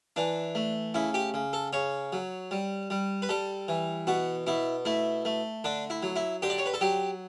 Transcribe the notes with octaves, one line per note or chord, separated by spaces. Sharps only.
E3 D4
A3
C#3 E4
G4
C#3
A4
C#3 C#5
F#3
G3
G3
B4
G3 A4
E3
B2 F#4
B2 E4
A3 E4
A3
D3 D4
E4
F#3
E4
D3 G4
D5
C#5
B4
A4
F#3 G4